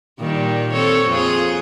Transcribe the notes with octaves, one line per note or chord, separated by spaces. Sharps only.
A#2 D#3 G3
C4 A4 C#5
F2 F4 G#4